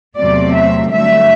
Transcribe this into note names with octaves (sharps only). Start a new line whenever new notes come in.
E2 C3 F#3 A3 C4 D5
E5
G2 D3 F#3 A3 E5